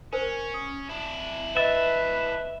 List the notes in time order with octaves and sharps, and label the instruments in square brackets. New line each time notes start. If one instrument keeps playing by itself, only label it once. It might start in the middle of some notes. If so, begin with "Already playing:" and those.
[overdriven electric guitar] C#4 [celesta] A#4 C5
[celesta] D#6
[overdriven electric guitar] D4 E4
[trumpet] B4 [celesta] D#5 A6 [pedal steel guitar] E5